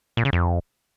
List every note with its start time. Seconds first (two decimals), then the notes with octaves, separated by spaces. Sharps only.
0.17 A#2
0.25 C#3
0.33 F2